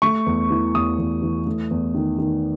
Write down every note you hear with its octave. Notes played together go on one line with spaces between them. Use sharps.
A3 C#6
E2
E3
E2 D#6
E2
E3
A3
E2
D#3
D#3